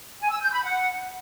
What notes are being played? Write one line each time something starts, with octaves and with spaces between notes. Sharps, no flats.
G#5
E6
G6
B5
F#5